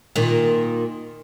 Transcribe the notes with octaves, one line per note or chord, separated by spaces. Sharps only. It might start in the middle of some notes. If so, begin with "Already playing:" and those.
A#2 D#3